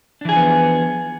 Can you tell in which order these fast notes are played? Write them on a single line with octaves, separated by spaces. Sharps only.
D4 E3 G#4 F3 B3